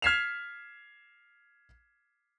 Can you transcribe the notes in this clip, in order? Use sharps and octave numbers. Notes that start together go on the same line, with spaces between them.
F6 G#6 B6 C7 E7 F7